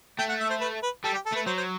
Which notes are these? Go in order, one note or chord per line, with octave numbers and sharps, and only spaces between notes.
A3 G5
F#5
E5
C5
B4
B4
G3 A4
G4
A4
A3 B4
F#3 C5
C5